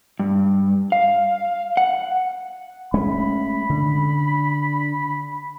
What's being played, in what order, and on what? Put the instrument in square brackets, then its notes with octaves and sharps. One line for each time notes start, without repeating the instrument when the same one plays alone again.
[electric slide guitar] G2
F5
F#5
[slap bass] G#3 A3 C#4 [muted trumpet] B5
[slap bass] D3